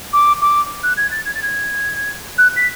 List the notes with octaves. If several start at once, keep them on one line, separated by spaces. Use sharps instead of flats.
D6
D6
F#6
G#6
A6
G#6
A6
G#6
F#6
B6